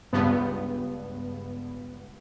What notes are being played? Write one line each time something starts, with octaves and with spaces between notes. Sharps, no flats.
C#2 G2 B3